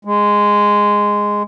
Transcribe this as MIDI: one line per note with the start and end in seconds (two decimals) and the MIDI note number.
0.05 1.43 56